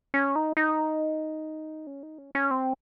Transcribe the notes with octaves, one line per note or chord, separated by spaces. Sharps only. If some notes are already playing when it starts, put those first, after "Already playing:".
C#4
D#4
D#4
C#4
D#4
C#4
C#4
C4